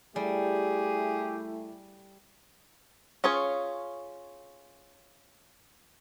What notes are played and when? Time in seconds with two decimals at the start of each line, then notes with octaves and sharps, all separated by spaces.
0.16 G3 A3 E4 G4 G#4
3.24 C#4 F4 G#4 C#5